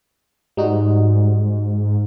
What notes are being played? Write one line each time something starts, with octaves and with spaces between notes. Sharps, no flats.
G#2 G3 D#4 F#4